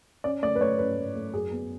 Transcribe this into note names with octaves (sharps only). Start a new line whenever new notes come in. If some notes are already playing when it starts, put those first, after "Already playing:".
C#4 D5
A3 D5
B4
A3 C#5
C#4 B4
A3
A3
F#2 G#4
B3